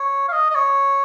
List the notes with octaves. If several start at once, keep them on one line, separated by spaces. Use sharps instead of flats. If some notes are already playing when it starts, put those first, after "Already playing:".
Already playing: C#5
F5
D#5
D#5
C#5